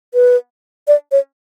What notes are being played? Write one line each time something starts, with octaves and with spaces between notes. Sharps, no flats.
B4
D5
C#5